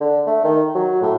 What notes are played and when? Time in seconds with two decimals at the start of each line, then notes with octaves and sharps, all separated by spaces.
0.01 D3
0.27 A3
0.44 D#3
0.75 F#3
1.02 A2